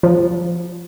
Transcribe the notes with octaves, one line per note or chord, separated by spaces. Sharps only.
F3